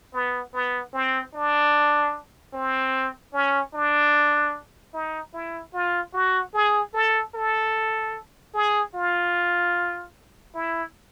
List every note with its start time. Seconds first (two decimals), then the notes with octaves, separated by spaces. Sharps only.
0.14 B3
0.54 B3
0.94 C4
1.34 D4
2.54 C4
3.33 C#4
3.74 D4
4.94 D#4
5.34 E4
5.74 F4
6.14 F#4
6.54 G#4
6.94 A4
7.35 A4
8.54 G#4
8.94 F4
10.55 E4